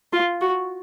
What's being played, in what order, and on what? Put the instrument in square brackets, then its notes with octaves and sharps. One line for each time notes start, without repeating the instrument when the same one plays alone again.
[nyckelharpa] F4
F#4